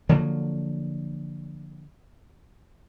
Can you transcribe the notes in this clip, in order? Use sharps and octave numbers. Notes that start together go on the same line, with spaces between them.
D3 F3 F#3 A#3